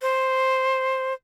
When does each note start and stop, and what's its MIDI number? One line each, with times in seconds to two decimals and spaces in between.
0.02 1.14 72